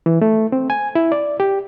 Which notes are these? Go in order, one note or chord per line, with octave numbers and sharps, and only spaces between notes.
E3
A3
C4
G#5
E4
D5
G4